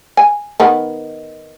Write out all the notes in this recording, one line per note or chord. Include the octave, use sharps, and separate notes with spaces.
G#5
D#3 B3